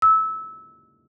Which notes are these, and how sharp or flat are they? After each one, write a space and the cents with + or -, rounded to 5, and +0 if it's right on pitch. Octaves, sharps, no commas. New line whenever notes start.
E6 -20